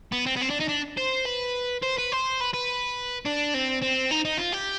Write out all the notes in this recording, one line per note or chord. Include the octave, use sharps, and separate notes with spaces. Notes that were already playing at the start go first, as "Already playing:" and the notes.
B3
C4
B3
C4
D4
D#4
D4
C5
B4
C5
B4
C5
B4
B4
D4
C4
C4
D#4
D#4
F4
G4